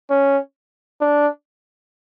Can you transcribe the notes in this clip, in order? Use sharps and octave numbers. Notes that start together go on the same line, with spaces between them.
C#4
D4